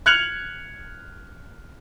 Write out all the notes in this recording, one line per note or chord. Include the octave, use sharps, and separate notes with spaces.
F6 F#6 G#6 C#7 F7 F#7